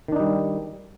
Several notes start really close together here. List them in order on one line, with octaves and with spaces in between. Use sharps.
D#3 D4 D#4 G3